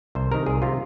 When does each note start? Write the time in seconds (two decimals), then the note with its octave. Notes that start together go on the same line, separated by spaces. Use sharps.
0.15 C2 C5
0.31 C3 D#3 A#4
0.46 C2 G#4
0.62 C3 D#3 F4